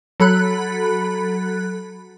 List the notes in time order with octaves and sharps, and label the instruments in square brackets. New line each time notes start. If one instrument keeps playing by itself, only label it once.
[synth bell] F#3 A4 B5 F#6